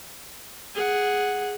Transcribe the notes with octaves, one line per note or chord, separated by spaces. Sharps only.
G#4 F#5